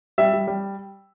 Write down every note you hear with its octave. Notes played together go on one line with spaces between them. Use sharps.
G3 E5
G3
G3